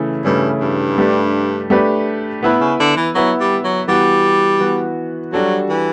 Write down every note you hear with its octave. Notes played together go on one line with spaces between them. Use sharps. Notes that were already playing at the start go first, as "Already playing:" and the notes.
Already playing: C#3 E3 A3 C#4 E4
G2 C#3 E3 A3 C#4 E4
G2
A3 D4 G4 B4
A3 D4 G4 B4
A2 B3 E4 B4
C#3
D3
E3
F#3 B3 E4 B4
G3
F#3
E3 G3 B3 F#4
E3 B3 F#4
F#3 G3 D4 F#4 A4
E3